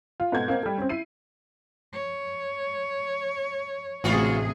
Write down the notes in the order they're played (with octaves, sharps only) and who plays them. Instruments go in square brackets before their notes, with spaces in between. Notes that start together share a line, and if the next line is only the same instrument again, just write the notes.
[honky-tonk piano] F4
G#2 B2 A3 F#5 G6 G#6
A#3 C4
G3 A3
C4 C#4
E4 C7 D#7
[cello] C#5
[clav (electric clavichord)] A1 [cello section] D2 C3 G#4 [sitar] B3 F4 F#4